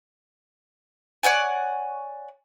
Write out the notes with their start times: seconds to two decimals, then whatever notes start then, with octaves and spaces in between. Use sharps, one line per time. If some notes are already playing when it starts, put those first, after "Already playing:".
1.23 C#5 D5 F#5 G#5